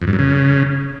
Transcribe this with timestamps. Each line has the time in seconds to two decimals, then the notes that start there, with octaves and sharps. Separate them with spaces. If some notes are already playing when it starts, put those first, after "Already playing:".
0.02 F2
0.07 G2
0.13 F#2
0.19 C#3